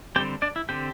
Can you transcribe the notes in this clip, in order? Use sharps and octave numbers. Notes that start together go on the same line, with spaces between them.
D3 G3 C4 G4 G5
D4 D5
E4
D3 C4 G4